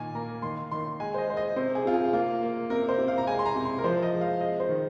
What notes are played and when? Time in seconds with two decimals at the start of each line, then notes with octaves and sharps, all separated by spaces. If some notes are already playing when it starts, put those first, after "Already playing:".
Already playing: A#2 D#3 G#5
0.15 A#3 A#5
0.42 D#3 C6
0.71 D#3 C6
1.00 G#3 G#5
1.14 C5
1.18 D#5
1.27 G#3 C5
1.37 D#5
1.56 C3 C5
1.75 G#4
1.85 C3 F4
1.94 G#4
2.13 A#3 F4
2.42 A#3
2.70 C3 A#4
2.89 C5
2.98 C3
3.08 F5
3.18 A#5
3.26 G#3 G#5
3.39 C6
3.46 A#5
3.55 C3
3.65 C6
3.79 A#4
3.84 F3 C5
4.03 D#5
4.12 G#3
4.21 F5
4.40 G#3 D#5
4.60 C5
4.69 D#3